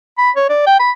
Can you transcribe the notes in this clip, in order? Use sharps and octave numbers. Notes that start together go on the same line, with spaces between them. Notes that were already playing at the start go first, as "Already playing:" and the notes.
B5
C#5
D5
G5
B5